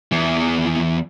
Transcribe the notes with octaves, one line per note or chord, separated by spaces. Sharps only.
E2 E3